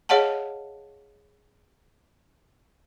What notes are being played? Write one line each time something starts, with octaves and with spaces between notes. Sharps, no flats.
G#4 C#5 D#5 F5 F#5 A5